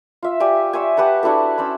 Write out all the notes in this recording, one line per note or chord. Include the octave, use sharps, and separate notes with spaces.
F4 E5
G4 D5 G#5
C5 C#5 E5 G#5
G4 B4 F#5 A5
D4 E4 F#4 A4
C#4 C5 D5 B5